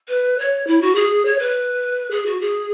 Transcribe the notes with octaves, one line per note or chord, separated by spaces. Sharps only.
B4
C#5
E4
F#4
G#4
C#5
B4
G#4
F#4
G#4